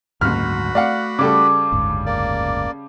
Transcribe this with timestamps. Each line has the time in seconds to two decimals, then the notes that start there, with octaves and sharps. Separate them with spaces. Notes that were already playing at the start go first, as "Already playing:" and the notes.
0.21 F#1 D2 G#2 F#3 F#4 B5 F6
0.75 A3 D5 F5 F#5
1.19 C#3 G3 A4 D6
1.72 F#1 D2 G#2
2.06 A#3 D5